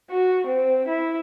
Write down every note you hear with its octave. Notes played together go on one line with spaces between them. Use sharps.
F#4
C4
E4